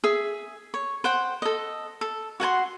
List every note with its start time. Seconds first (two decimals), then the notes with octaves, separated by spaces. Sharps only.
0.04 G#4 E5
0.74 C#5
1.04 C5 F#5 G5
1.42 A4 D#5
2.01 A4
2.40 F#4 F#5 G#5 C6